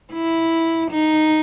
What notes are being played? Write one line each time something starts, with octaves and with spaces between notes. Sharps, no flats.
E4
D#4